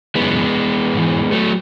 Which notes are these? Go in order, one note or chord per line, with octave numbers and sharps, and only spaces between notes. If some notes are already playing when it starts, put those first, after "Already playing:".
F#2 C#3 E3 G#3 B3
G#2 E3
F#3 A3